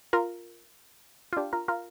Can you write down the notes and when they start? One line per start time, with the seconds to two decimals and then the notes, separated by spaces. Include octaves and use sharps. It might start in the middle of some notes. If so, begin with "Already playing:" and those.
0.13 F4 A#4
1.33 F4
1.37 D4 G4
1.53 F4 A#4
1.68 F4 A#4